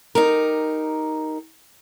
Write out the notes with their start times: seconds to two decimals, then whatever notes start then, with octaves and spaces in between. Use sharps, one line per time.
0.15 D#4 G4 A#4